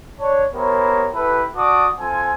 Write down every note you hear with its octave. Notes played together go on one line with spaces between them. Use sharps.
D4 C#5
B3 E4 G4 A#4 C5 C#5
E4 G4 A4 B4
F#4 D5 F#5 A5 D6 D#6
C4 F4 A4 G#5